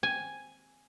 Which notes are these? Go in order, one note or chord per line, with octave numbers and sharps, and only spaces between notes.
G#5